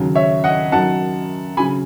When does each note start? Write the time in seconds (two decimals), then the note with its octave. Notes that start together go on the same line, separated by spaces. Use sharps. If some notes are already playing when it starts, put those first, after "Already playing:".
Already playing: D#2 C#3 F#3
0.15 C#5 E5
0.44 D#5 F#5
0.72 F#2 D#3 F#3 F#5 A5
1.57 C#3 F#3 G#5 B5